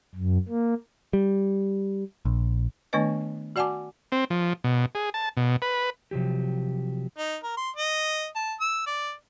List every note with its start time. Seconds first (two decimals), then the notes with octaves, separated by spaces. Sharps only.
0.15 F#2
0.49 A#3
1.13 G3
2.25 A#1
2.93 D#3 A3 B3 D4 B4 D#5
3.56 F#4 D5 F#5 G#5 A5 D6
4.12 C4
4.30 F3
4.64 B2
4.95 G#4
5.14 A5
5.37 B2
5.62 B4
6.11 C3 F3 F#3 G4
7.17 D#4
7.44 A#4
7.57 C6
7.76 D#5
8.36 A5
8.61 E6
8.87 D5